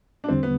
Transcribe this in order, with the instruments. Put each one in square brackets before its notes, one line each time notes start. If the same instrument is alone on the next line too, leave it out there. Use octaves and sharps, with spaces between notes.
[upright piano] D4
[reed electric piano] E2 D3 G3 [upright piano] C4
[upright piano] B3